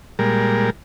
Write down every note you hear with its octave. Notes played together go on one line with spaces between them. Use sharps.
A#2 G3 G#3 A#4